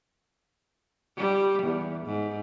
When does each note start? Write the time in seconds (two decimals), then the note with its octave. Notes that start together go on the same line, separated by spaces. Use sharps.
1.17 G3
1.63 E2
2.06 G#2